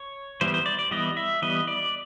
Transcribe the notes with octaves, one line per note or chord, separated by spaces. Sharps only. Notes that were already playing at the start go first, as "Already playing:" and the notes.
Already playing: C#5
E3 G3 B3 C5
C5
D5
D5
E3 G3 B3 D#5
E5
E3 G3 B3 D#5
D5